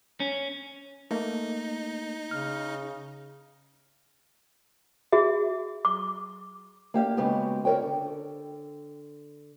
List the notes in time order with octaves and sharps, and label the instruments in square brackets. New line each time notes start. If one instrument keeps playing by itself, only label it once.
[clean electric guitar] C#4
[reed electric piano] A3 A#3 [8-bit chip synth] D#4
[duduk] C#3 [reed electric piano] F6
[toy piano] F#4 G#4 E5
D6
[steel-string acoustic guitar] A#3 G4 E5 F5
C#3 G#3 B3 F#4 G4
F#4 A#4 B4 C#5 G5
D3